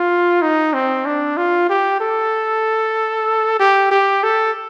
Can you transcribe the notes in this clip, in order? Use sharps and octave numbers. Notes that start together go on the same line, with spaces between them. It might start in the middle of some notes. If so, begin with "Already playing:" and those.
Already playing: F4
D#4
C4
D4
F4
G4
A4
G4
G4
A4